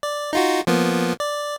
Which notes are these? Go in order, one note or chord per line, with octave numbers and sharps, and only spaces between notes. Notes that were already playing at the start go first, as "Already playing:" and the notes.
D5
D#4 F4 F#4
F3 A#3 B3
D5